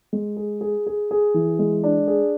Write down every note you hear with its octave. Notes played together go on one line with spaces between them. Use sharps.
G#3
G#4
G#4
G#4
G#4
E3
G#3
D4
G#4